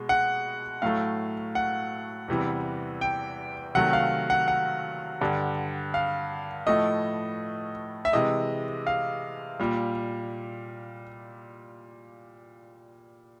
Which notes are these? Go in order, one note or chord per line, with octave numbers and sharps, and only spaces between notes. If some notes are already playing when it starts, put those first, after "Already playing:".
Already playing: B2 G#3
F#5
A2 F#3 A3 F5
F#5
E2 C3 E3 G3
G5
C3 D#3 F#3 A3 F#5
F5
F#5
F#5
G2 D3 G3
F5
A2 F3 A3 D#5
E5
C3 E3 G#3 D#5
F5
A#2 G3